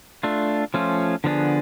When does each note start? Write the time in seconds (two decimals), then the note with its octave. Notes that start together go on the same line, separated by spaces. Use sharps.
0.23 A3 D4 F4
0.74 F3 A3 C#4 F4
1.24 D3 F3 B3 D4 G#4